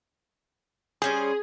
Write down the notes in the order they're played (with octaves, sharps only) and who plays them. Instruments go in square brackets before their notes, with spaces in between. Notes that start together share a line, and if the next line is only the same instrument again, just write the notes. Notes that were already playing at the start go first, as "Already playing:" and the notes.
[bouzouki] G3 C#4 C5 [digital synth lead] G#4